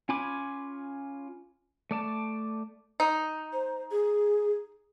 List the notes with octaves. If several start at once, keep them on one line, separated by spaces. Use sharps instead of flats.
C#4 F4 G#5 B5 D6
A3 D5 A5
D#4
C5
G#4